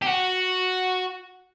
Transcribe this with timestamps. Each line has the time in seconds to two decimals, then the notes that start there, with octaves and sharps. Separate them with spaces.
0.02 G4
0.06 F#4